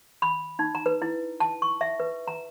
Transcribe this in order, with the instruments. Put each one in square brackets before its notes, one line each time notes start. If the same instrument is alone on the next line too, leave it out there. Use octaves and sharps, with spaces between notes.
[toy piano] B5
D#4
A#5
B4
E4
A5
C#6
E5
B4
A#5